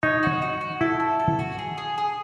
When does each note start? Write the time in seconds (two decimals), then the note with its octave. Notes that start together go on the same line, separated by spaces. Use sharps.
0.03 D#4 C#5
0.23 F#4
0.42 F#4
0.61 F#4
0.81 E4 A4
1.00 A4
1.19 A4
1.39 F#4
1.59 G#4
1.78 G#4
1.98 G#4